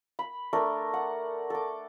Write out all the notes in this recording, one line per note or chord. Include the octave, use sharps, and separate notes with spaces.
B5
A3 D4 A#4
F#5
A4 D6